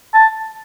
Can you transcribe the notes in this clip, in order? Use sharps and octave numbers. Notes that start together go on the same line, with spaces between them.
A5